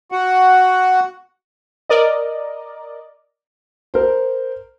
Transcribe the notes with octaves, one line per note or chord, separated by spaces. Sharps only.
F#4 F#5
A#4 D5 D#5
A#4 C5